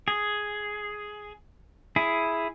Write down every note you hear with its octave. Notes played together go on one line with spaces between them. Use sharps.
G#4
E4 G#4